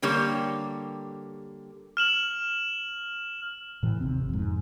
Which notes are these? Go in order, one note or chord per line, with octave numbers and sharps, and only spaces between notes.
D3 G3 A#3 G4 C#5
F6 E7 F#7
A2 E3
G#1 D#2 C3 C4
F2 G#2